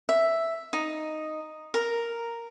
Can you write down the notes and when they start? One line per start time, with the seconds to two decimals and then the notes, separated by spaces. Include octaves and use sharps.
0.09 E5
0.73 D#4
1.74 A#4